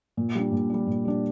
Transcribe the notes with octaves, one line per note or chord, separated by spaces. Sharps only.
A#2
G3 D4
A#2
G3 D4
A#2
G3 D4